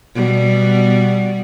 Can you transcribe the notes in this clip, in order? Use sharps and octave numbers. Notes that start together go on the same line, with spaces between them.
B2 G3 B3